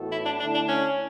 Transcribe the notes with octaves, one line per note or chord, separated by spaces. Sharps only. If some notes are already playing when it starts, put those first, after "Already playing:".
Already playing: A2 E3 B3 F#4 A4
E4
D4
D3 A3 D4 E4
D4
C#4